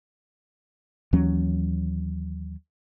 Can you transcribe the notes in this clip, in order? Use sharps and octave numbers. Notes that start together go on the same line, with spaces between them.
D#2 E3 F#3 C#4